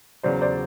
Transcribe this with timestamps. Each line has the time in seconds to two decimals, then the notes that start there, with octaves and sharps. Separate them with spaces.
0.23 E2 C#3 F#3 C5 D5
0.41 C5 D5